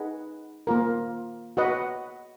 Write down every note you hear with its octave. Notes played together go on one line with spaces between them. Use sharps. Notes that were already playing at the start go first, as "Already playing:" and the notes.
Already playing: D#4 G#4 B4 D#5 F#5
A#3 F4 A#4
F#4 B4 D#5 F#5